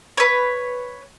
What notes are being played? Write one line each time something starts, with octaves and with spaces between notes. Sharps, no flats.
B4 C#5